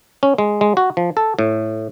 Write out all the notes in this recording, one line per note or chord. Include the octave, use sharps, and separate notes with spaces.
C#4
G#3
G#3
F#4
F3
A4
A2